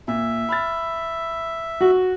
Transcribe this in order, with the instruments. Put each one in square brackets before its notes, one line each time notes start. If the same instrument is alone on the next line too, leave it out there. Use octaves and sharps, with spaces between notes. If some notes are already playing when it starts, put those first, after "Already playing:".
[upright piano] A#2 [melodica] E5
[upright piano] B5 F6 A6
[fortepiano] F#4